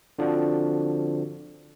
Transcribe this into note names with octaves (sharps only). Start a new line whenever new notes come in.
D3 F3 C4 D4 F#4